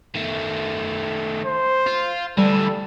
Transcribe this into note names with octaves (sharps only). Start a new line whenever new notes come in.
D#3 A3
C5
F4
D2 E3 G3 A4